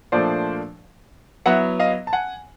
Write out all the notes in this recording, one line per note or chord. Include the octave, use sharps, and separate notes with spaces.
A#2 F3 A3 D4 C5 D5
F#3 B3 E4 E5 F#5
D#5 F5
A5
F#5 G#5